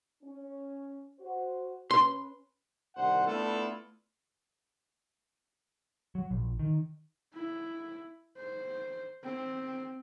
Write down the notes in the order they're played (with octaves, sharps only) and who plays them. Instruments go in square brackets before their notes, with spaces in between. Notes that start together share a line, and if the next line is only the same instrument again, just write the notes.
[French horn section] C#4
F#4 C5
[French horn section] C#4 B4 [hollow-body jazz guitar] C6
[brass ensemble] C2 D#3 D4 C5 F#5
A3 B3 D4 E4 F4 A4
[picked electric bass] F#3
A#1
D#3
[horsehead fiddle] E4
C5
C4